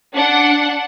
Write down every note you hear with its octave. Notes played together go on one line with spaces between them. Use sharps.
D4 F#5